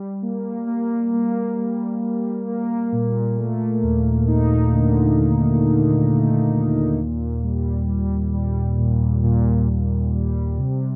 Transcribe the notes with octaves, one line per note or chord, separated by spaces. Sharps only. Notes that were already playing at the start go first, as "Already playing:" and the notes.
Already playing: G3
A#3
A#3
A#3
G3
G3
A#3
A#2
A3
D#2
D#4
D3
D#2
D3
A3
D#2
A#2
G3
G3
G3
A#2
A#2
A#2
G3
C3